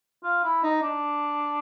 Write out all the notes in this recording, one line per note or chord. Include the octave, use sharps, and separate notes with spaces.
F4
E4
D#4
D4